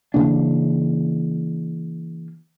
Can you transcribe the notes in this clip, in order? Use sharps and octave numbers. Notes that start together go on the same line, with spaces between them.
C#3 E3 A#3 D4